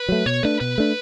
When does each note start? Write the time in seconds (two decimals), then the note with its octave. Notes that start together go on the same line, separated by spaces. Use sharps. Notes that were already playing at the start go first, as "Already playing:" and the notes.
Already playing: B4
0.09 F#3 A3
0.26 B2 C#5
0.43 A3 D4 B4
0.60 B2 B4
0.78 A3 D4